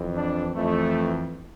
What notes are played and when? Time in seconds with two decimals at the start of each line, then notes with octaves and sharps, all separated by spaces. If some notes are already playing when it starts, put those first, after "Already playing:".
Already playing: F2 E3
0.17 D4
0.55 F2 E3 A3